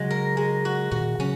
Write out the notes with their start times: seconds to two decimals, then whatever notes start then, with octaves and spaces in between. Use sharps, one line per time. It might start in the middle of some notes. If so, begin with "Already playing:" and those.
Already playing: C#3 F#3 G#3 F#4
0.10 A#4
0.37 G#3
0.65 F#4
0.91 A#2 D#3 F#4
1.19 C#3 F#3 C#4